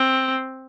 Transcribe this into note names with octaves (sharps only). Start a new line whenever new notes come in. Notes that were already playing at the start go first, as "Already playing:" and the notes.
Already playing: C4